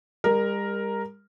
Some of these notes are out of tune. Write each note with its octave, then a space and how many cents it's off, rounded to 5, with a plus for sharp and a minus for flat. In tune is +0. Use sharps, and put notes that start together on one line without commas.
G3 +45 A#4 +0